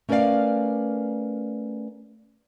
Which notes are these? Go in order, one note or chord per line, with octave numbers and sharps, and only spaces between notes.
A3 C#4 A#4 B4 D5 F5